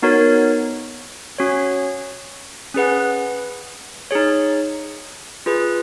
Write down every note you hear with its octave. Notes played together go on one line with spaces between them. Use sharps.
B3 D#4 F#4 A#4 C#5
C#4 F#4 C#5
C#4 G#4 B4 F#5
D#4 G#4 C#5
F4 G#4 B4